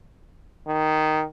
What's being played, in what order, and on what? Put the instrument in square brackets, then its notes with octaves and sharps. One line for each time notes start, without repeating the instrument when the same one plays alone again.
[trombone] D#3